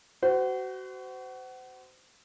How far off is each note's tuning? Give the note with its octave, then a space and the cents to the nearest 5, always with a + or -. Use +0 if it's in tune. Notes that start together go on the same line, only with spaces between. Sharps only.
F#4 +25 C5 -30